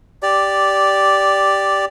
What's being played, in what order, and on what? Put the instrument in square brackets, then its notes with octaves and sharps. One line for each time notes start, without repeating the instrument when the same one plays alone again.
[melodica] G4 D5